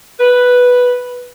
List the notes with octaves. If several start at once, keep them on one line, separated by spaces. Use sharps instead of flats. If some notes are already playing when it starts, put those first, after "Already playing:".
B4